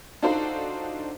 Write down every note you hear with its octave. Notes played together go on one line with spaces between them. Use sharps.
D4 D#4 F4 F#4 A4 C5